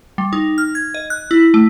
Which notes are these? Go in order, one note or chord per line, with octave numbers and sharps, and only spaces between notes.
G3
D#4
F6
G#6
D#5
F#6
E4
A3